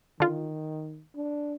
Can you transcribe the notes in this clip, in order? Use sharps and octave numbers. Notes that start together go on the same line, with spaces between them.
D3 D#3 F4
D4